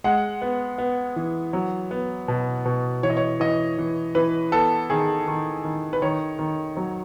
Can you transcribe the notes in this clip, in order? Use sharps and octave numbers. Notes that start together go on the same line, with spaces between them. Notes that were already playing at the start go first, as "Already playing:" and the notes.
G#3 F#5
B3
B3
E3
F#3
B3
B2
B2
E3 C#5
D#5
C#5
E3 D#5
E3
E3 B4
B3 A4
D#3 G#4
D#3
D#3
B4
D#3 C#5
D#3
F#3